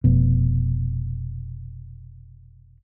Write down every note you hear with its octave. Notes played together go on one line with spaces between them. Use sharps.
F1 B2